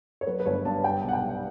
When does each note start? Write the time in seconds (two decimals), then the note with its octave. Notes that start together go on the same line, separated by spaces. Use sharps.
0.21 C#5
0.27 F#3 B4
0.40 B4
0.46 G1 C#5
0.65 G2 A5
0.84 G3 G5
1.04 B1 F#5
1.13 G5
1.24 G3